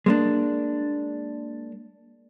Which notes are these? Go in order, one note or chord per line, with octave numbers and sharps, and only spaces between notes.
G#3 A#3 D4